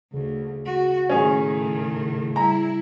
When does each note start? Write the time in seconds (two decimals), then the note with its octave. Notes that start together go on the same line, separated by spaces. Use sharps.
0.13 D2 C#3
0.65 F#4
1.10 A2 D#3 C#4 G#4
2.36 G3 E4 A#5